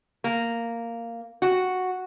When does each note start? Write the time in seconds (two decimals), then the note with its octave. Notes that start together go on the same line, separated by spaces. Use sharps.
0.24 A#3
1.42 F#4